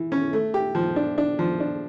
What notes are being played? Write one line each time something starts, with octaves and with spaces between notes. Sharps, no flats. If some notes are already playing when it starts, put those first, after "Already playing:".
Already playing: E3
C#4
A3
G4
F3
D4
D4
F3
D4